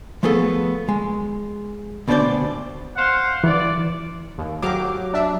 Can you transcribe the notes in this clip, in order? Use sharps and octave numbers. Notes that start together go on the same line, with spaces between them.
F3 A3 B3 G#4 A4
G#3
D2 B2 D4 D#4 C5 D5
C5 F5 F#5
E3 D5
D#2
F#3 G4 F5 D6
D4 E5